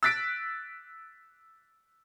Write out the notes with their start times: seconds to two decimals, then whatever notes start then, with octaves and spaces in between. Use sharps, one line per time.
0.03 E6 F#6 A6 B6 D7